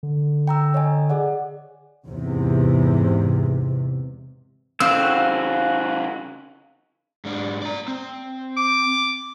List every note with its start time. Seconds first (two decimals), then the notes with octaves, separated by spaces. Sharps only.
0.03 D3
0.47 G5 A#5 E6
0.74 C#5 D#5 G#5
1.10 G#4 D5 F#5
2.06 E2 G#2 C3
4.80 C#3 E3 C4 F#4 F5 E6
7.25 G#2 D4
7.62 D5 A#5
7.88 C4
8.57 D6